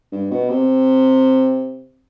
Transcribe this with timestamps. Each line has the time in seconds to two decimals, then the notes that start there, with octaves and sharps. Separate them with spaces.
0.12 G2
0.31 B2
0.50 C3